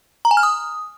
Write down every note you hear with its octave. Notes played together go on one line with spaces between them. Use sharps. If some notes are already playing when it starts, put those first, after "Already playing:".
A#5
G#5
F6
D#6